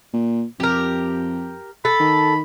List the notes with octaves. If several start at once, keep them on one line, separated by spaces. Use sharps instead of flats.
A#2
F2 G4 A#4
A4 B5
D#3